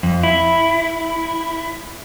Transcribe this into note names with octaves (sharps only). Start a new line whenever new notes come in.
F2
E4